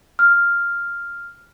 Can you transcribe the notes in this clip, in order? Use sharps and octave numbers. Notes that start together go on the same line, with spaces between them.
F6